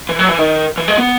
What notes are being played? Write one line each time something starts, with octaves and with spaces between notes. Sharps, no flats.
E3
F#3
E3
D#3
E3
G#3
B3